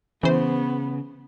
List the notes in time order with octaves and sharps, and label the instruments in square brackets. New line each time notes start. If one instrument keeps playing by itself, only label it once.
[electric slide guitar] C#3 [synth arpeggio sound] E3 C5 [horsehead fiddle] B3